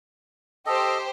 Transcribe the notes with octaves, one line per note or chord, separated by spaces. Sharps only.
G4 A4 C5 D#5